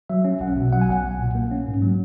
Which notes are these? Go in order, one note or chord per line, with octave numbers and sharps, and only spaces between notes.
F#3 E5
C#4
B1 F#5
B2
F#3 F#5
G#5
B1 F#5
B1
A#2
A#3
C#4
G#2
F#3